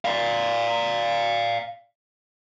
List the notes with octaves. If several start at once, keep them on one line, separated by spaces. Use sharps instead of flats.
D5 F5